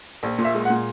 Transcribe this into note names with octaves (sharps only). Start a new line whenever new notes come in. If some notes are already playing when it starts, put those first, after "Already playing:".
A#1
A#2
E5
G#3
F#5
A#2